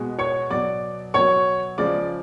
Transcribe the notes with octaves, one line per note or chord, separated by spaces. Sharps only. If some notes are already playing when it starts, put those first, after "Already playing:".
Already playing: B2 G#3
C#5 C#6
B2 F#3 D5 D6
B2 F#3 C#5 C#6
C#3 F3 G#3 D5 D6